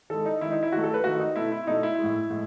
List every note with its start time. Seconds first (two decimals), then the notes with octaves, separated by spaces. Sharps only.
0.10 D#3 G#3 A4
0.25 D#4
0.41 D#3 G#3 E4
0.51 D#4
0.63 E4
0.72 D#3 F#3 A3 F#4
0.84 A4
0.94 B4
1.04 D#3 F#3 A3 F#4
1.20 D#4
1.36 B2 A3 E4
1.52 E4
1.67 B2 A3 D#4
1.83 E4
1.99 G#3
2.04 A2
2.30 A2 G#3